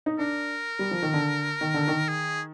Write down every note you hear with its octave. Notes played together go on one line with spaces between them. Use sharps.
D#4
D4 A#4
G3
F3
D#3
D3
D#3
D3
D#3
G#4